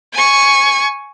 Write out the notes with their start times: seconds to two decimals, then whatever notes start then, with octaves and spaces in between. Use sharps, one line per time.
0.13 G#5 C#6